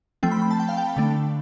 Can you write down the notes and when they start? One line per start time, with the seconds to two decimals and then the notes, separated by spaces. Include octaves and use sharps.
0.23 F3 A3 C4 G5
0.32 B5
0.42 B5
0.51 A5
0.60 G5
0.69 F5
0.77 G5
0.97 D3 A3 D4